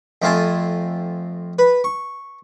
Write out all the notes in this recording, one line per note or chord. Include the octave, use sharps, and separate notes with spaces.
F2 A3 C4 F4 G#5 A5
B4
C#6